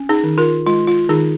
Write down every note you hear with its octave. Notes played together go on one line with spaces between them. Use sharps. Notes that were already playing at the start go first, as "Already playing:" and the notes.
Already playing: C#4
D#4 G#4
D#3
F4 A#4
G#3 F4
F4
D#3 D#4 G#4